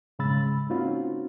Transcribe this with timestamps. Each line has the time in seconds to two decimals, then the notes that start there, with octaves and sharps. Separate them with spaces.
0.19 G#2 C#3 G#3 B5 E6 A6
0.69 A#3 C4 C#4 D#4 F4 F#4